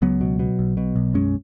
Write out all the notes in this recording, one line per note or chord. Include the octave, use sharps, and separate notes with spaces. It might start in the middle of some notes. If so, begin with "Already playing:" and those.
C#2 F#3 B3
B2
B2
B1
B2
B1
F#2 G#3 C#4